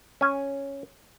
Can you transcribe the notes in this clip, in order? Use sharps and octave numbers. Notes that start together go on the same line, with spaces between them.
C#4 G#5